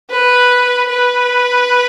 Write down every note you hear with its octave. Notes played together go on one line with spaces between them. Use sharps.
B4
B4